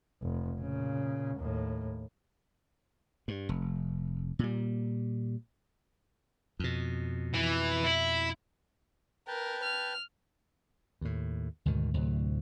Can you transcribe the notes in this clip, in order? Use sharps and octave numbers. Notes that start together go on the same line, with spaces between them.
F1
A#2 C#3
D#2 A2
G2
F1
A#2 G3
F2 B2
E3
E4
A#4 B4 G5 A5
F6
D#2 A2
D2 G#2 B2 D#3
D2 A2 C3 F#3